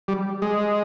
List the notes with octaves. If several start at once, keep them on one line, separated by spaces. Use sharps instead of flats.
G3
G#3